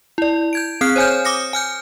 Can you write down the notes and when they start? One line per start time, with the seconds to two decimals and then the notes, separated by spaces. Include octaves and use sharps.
0.18 E4 D5
0.53 G6 G#6 D7
0.81 C4 G#4 F6 F#6 C7
0.96 C5 C#5 G#5 F6 G6
1.25 D6 D#6 A#6 C#7
1.53 G#5 F6 G6